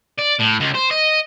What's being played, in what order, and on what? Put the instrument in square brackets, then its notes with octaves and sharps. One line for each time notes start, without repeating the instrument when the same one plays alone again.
[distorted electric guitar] D5
A2
C#2
C5
D#5